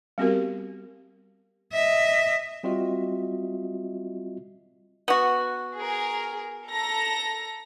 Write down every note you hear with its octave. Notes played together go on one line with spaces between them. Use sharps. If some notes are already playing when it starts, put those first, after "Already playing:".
G3 B3 C4 F#4 G4 A#4
D#5 E5
G3 C4 F4 F#4 D#5 E5
B3 F#4
G#4 A#4
A4 A#5 A#6